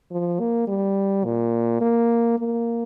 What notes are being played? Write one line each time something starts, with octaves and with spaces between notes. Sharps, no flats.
F3
A#3
G3
A#2
A#3
A#3